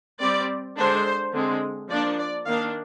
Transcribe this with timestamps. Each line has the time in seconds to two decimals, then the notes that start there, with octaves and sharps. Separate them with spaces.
0.21 G3 C4 D5
0.77 D3 G#3 D4 C5
1.34 D3 G#3 C4
1.90 F3 A#3 D4 D5
2.19 D5
2.47 D#3 A#3 D4 F5